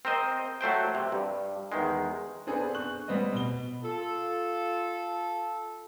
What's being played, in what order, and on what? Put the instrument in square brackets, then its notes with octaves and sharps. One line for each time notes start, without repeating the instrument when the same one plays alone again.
[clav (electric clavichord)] C4 A#4 C5 D#5
F#3 A3 C5 G5
C3
G2
E2 D#3 G#3
[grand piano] B3 C4 D4 G#4 A4 B4
C#6 F#6 G6 F#7
G3 B3 C4 B4 D#5
B2 G7
[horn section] F4 A4